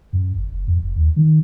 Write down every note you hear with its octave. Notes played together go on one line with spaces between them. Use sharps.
F#2
G1
F#1
F2
F1
D#2
D#3